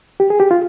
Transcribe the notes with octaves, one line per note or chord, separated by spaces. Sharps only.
G4
G#4
G4
F4